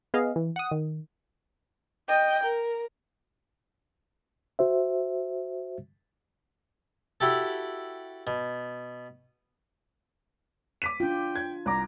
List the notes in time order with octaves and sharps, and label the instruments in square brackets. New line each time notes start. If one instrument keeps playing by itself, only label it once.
[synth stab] B3 G#4 D#5 F5
E3
F#5 D#6
D#3
[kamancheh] D#5 G5
A#4
[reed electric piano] F#4 C5 E5
[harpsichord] E4 F#4 G4 A4
B2
[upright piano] D6 B6 D#7
[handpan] D4 F4 [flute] G5
[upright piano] G#6
[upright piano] C2 D6 [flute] A#5